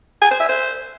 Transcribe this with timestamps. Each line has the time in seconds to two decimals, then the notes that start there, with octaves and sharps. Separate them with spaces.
0.22 G#5
0.31 C5
0.40 E5
0.49 C5